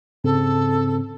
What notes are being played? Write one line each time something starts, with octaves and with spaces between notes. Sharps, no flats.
G#2 C#3 C4 A4